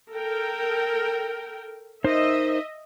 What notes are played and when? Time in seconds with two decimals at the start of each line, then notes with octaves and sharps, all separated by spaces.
0.10 A4 A#4 G5
2.04 D#4 A#4 C5 D#5 E5